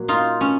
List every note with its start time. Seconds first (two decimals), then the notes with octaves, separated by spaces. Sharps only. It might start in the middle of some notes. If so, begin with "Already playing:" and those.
Already playing: A#2 F#3
0.08 D#4 F4
0.41 C#4